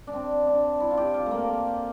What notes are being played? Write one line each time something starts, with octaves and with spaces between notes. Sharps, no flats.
D4
C4
D4
E4
F4
G4
F4
A3 A#3
A#3